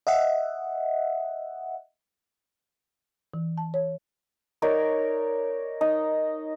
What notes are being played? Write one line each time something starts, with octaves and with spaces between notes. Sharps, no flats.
D#5 E5 F#5
E3
A5
C#5
D#4 A#4 C#5 D5
D#4